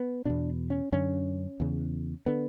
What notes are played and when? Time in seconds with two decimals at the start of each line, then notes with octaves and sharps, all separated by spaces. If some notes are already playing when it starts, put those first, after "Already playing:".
Already playing: B3
0.25 E2 B2 D4
0.70 C#4
0.92 F#2 D3 C#4
1.60 E2 C#3
2.26 D3 B3